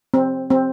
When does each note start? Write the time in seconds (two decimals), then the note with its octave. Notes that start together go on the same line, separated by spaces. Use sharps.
0.14 C4
0.50 C4